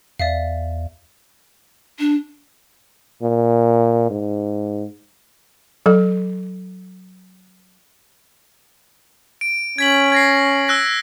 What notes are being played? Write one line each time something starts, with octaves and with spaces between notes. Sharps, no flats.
E2 D5 E5 F5
D4
A#2
G#2
F#3 A4
D7
C#4 G#6 B6 F#7
G#6 A#6 C7
E6 F#6 A#6